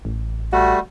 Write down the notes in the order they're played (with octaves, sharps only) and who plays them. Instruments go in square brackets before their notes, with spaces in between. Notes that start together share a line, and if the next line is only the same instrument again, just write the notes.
[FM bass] A1
[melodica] G3 A3 [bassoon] F#4